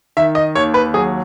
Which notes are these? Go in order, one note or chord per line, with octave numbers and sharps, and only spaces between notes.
D#3 E5
D#5
D#2 C#5
B4
F#3 G#4